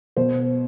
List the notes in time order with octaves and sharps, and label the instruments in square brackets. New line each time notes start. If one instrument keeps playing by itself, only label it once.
[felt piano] B2 C5